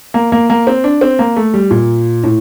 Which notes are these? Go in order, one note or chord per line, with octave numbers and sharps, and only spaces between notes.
A#3
A#3
A#3
C4
D4
C4
A#3
A3
G3
A#2
A2